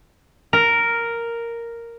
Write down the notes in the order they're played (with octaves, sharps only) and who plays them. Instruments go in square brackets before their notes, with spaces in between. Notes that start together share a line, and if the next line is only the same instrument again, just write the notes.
[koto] A#4